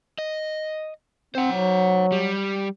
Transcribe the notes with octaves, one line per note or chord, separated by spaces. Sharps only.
D#5
C4 C5 F#5
F#3
G3